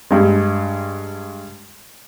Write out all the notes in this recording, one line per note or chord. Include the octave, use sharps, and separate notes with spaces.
G2 G#3